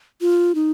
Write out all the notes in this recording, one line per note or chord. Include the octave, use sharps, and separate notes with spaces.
F4
D#4